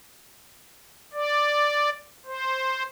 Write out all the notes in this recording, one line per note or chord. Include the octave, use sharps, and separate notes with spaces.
D5
C5